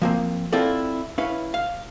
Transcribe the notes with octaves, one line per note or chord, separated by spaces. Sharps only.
F3 A#3 C4
C4 E4 F4 A4 D5
C#4 E4 B4 F5
F5